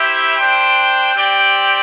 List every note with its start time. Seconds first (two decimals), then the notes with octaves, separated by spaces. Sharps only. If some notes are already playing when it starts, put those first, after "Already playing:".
Already playing: E4 G4 C5 E5 G5
0.36 D4 C5 G5
1.15 C4 G4 D5 G5